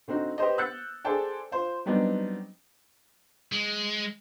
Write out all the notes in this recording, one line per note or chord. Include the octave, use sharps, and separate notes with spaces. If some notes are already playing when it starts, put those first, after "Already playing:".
D3 C4 D#4 F#4
G4 B4 C5 D#5
E6 F#6 G6 A6 C#7
G#4 A4 C5 D5 G5 A5
F4 C5
F#3 G3 B3 C4 D4 D#4
G#3